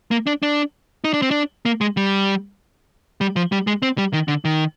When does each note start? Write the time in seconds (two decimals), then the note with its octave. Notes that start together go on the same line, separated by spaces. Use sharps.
0.11 A#3
0.27 D4
0.43 D4
1.04 D#4
1.13 D4
1.22 C4
1.31 D4
1.65 A#3
1.81 G#3
1.97 G3
3.21 G3
3.36 F3
3.52 G3
3.67 G#3
3.82 C4
3.98 G3
4.13 D#3
4.28 D3
4.45 D#3